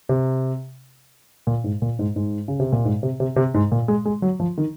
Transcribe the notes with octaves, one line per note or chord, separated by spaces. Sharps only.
C3
A#2
G#2
A#2
G#2
G#2
C#3
C3
A#2
G#2
C3
C3
C3
G#2
A#2
G#3
G#3
F#3
F3
D#3